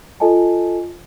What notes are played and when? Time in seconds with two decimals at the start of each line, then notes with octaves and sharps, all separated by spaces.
0.20 F4 A4 D#5 G#5 A5